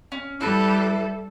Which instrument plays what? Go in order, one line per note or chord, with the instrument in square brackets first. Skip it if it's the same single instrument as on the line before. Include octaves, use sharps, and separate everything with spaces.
[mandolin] C#4
[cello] G3 A4 [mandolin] E4 B4 A5